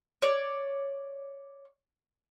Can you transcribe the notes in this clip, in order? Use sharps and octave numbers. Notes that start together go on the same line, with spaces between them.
C#5 D5